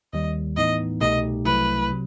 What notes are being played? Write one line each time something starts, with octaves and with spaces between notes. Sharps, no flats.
D#2 D#3 G3 D#5
A2 E3 B3 D#4 D#5
C2 B2 A3 D#4 G4 D#5
C2 C3 F#3 A3 E4 B4
C3 F#3